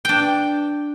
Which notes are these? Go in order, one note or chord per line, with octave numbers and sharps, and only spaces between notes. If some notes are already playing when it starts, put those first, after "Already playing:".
D4 G5